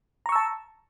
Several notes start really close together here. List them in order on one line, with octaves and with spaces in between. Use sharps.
A#5 C#6 E6 A5